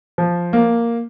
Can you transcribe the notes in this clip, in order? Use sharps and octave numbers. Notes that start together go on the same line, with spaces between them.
F3
A#3